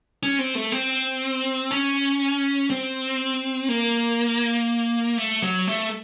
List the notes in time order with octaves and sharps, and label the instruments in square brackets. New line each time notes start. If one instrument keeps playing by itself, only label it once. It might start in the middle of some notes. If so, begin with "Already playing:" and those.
[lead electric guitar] C#4
C4
A3
C4
C#4
C4
A#3
A3
F#3
A3